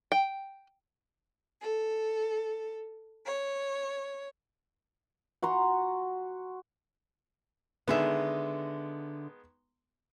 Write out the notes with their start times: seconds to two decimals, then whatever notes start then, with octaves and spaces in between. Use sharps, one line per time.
0.12 G5
1.62 A4
3.26 C#5
5.42 F#4 A#5 C6
7.88 D3 D#3 G#3 B3 G#4 E5